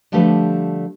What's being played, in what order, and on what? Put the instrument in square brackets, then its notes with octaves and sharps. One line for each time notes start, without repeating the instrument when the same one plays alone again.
[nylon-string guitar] D3 F3 G3 A3 G4 B4